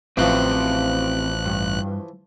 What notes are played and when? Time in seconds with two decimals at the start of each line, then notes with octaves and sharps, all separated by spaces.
0.17 A1 E3 F3 C4 F#4 G4 F#6
1.45 G2